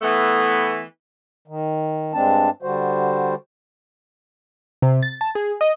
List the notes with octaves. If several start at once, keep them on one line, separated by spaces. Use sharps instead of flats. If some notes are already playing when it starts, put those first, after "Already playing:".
E3 A3 B3
D#3
G2 G#3 C4 D4 A5
D3 G3 F#4 C5
C3
A6
A5
G#4
D#5